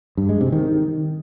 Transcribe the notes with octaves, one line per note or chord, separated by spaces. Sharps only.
G2
G#3
C3
D#3